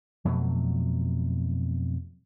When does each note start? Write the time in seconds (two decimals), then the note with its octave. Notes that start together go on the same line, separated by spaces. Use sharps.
0.25 F2 B2 F#3 A3